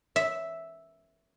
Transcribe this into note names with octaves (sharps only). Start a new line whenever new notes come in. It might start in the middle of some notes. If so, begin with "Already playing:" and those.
E5